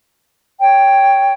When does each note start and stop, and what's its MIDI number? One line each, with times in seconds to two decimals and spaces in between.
0.60 1.33 73
0.60 1.33 79